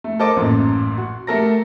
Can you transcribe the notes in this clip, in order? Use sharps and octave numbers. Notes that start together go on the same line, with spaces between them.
A3
A4 A#4 C5 D#5 A5 D6
A1 F#2 A#2
F#4
A3 G4 A4 A#4 A#5 A#6